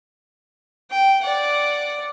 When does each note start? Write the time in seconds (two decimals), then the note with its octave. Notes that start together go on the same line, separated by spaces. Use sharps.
0.91 G5
1.24 D5 F#5